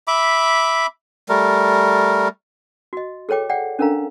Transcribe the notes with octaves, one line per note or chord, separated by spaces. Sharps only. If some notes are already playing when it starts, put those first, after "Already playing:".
E5 B5 D6
G3 A3 A#4
F#4 D#5
G#4 A4 C#5 G5 D6
D5 F#5 G5
C#4 D4 A4 A#4 F5 A#5